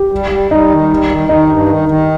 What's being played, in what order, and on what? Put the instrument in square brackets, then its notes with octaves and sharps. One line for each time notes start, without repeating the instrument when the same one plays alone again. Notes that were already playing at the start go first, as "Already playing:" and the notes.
Already playing: [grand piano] G4
[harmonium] G3
G3
[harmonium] G3 [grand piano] D#4
[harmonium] D#3
G3
D#3
[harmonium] D#3 [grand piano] D#4
[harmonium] G2
D#3
D#3